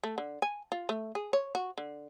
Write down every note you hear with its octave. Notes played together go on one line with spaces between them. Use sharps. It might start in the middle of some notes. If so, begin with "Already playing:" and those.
A3
D3
G#5
F4
A3
G#4
C#5
F#4
D3